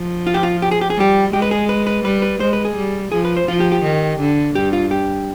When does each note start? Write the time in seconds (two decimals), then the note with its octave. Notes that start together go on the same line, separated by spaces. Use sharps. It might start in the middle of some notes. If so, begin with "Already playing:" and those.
Already playing: F3
0.27 F4
0.34 G4
0.43 F4
0.62 G4
0.71 G#4
0.81 G4
0.90 G#4
0.97 G3 G4
1.33 G#3 G4
1.42 B4
1.51 G#4
1.69 B4
1.87 B4
2.05 G3 B4
2.22 B4
2.40 G#3 C5
2.53 B4
2.65 G#4
2.76 G3
3.12 F3 G#4
3.25 B4
3.37 C5
3.48 F3 F4
3.60 G4
3.72 G4
3.83 D#3
4.20 D3
4.55 G2 G4
4.73 F4
4.91 G4